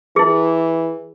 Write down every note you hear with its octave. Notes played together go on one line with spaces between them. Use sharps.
E3 E4 G#4